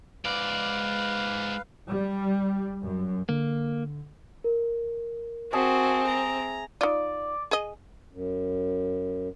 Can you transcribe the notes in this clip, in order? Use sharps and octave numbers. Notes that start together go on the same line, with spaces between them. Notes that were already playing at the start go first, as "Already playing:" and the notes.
G#2 B4 D5 F5
G3
F#2
D3 A#3
A#4
C4 F#4 G#4 E5 A5
A#5
D#4 F4 D5
G#4 D#5
F#2